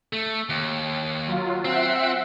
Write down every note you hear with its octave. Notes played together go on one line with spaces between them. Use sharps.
A3
D#2
F#3 F4
C4 E5 F#5